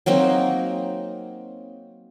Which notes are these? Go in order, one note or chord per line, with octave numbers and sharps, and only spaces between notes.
F#3 A#3 C4 D#4